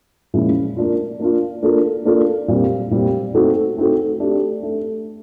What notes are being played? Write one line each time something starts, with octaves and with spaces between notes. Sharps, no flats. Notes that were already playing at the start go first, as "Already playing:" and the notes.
A#2 F3 G#3 C#4 E4
A#3 D4 F4
A#3 D4 F4
A#3 D4 F4 A4
A#3 D4 F4 A4
A#2 G3 C4
A#2 G3 C4
A3 C4 D#4 F#4 A4
A3 C4 D#4 F#4 A4
A3 D4 G4
A3